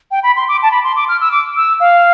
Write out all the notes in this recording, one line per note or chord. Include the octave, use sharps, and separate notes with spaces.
G5
B5
C6
D6
A5
B5
C6
D6
F6
E6
D6
E6
F5